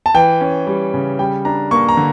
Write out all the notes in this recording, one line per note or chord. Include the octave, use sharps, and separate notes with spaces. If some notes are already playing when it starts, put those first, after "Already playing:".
A5
E3 G5
C#4
G3
C#3
G3 G5
D4 A#5
A#3 C#6
A#5
D3